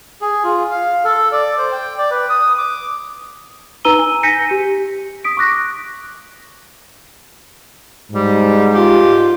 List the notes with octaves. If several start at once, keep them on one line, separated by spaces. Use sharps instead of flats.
G#4
F4
F5
A4
D5
C5
G5
D5
B4
D#6
D6
D#4 B4 A#5 E6 D#7 G7
G#5
G#5 G6 A#6 B6 C#7 D#7
G4
D#6 B6 D7
C#6 D6 F#6 A#6 B6
G#2 G3
F4 G4